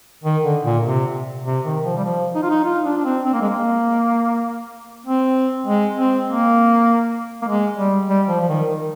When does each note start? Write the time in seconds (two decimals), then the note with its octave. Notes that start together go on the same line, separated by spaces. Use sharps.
0.24 D#3
0.44 D3
0.64 A#2
0.84 C3
1.45 C3
1.65 D#3
1.85 F3
1.97 G3
2.04 F3
2.35 D#4
2.43 F4
2.50 D#4
2.65 F4
2.85 D4
2.97 D4
3.05 C4
3.25 C4
3.33 A#3
3.41 G#3
3.49 A#3
5.06 C4
5.67 G#3
5.97 C4
6.27 A#3
7.42 A#3
7.47 G#3
7.78 G3
8.08 G3
8.28 F3
8.41 F3
8.49 D#3
8.68 D#3